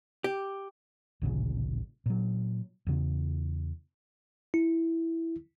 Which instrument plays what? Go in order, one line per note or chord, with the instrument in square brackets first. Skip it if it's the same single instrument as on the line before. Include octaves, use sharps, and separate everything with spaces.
[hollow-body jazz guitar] G4
[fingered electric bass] A1 D2 A#2 C#3
A#2 F#3
E2 C#3
[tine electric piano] E4